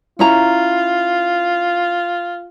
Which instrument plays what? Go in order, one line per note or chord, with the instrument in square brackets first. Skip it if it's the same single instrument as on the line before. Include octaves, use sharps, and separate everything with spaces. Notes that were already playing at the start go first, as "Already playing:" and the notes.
[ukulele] C#4 E4 A#5 [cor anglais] F4